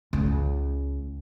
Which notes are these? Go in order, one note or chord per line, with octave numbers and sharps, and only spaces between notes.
C#2